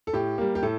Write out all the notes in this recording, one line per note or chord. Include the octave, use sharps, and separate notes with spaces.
A4
A2 G4
G3 A#3
G4
A2 A4